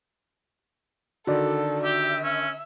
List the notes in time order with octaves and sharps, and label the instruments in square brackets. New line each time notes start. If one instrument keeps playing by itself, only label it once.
[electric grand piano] D3 D#3 [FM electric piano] F#4 D5 [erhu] A4
[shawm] G4 [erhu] E5
[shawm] C#4